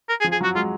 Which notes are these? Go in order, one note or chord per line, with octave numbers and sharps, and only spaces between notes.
A#4
G#4
F3
G#4
F#3 F#4
G#3 F4